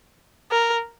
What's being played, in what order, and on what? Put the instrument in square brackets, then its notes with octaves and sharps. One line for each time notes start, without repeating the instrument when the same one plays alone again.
[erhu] A#4